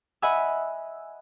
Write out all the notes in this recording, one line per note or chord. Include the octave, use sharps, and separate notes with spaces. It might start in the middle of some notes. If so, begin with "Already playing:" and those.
D#5 E5 F#5 G#5 B5 E6